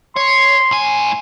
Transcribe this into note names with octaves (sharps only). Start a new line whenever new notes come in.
C#5 C6
A2 G#5